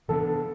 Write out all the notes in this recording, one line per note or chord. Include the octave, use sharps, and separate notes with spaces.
C3 E3 B3 D4 A4